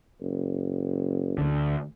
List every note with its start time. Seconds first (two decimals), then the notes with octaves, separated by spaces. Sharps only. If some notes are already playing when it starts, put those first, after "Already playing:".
0.20 F#1
1.38 D2 D3